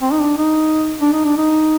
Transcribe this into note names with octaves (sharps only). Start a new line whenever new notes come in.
C4
D#4
D4
D#4
D4
D#4
D4
D#4